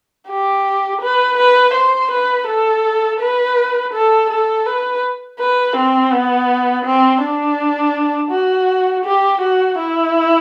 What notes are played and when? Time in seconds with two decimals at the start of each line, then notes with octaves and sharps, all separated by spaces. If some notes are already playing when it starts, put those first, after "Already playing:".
0.28 G4
1.01 B4
1.37 B4
1.74 C5
2.11 B4
2.47 A4
3.20 B4
3.93 A4
4.30 A4
4.66 B4
5.39 B4
5.76 C4
6.12 B3
6.85 C4
7.22 D4
8.31 F#4
9.05 G4
9.41 F#4
9.77 E4